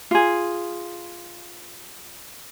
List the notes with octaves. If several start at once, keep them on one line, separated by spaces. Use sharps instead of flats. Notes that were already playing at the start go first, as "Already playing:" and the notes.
F4 G#4